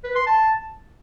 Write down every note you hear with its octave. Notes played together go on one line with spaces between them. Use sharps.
B4
C6
A5